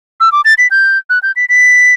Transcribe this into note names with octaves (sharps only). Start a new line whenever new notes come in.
E6
D6
A6
B6
G6
F#6
G6
B6
B6